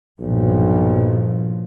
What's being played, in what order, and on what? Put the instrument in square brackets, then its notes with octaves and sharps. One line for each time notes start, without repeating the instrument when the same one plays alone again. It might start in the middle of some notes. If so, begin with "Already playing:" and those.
[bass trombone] B1 [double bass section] G2 A#2 F3